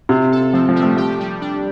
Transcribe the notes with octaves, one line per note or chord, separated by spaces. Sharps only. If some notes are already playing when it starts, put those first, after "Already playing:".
C3 F4
A4
F3 C4
F3
G3
A3
A3 G4
G3
D4